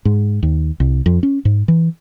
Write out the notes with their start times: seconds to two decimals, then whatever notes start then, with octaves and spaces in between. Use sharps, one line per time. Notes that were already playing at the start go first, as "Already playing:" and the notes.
0.05 G#2
0.43 D#2
0.80 C2
1.06 F2
1.23 C#4
1.45 G#2
1.68 E3